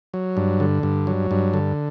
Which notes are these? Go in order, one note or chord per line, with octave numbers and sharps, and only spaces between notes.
F#3
G2
D3
G2
F#3
G2
D3